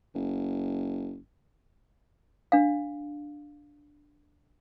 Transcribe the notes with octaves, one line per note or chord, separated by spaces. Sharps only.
F#1
D4 F5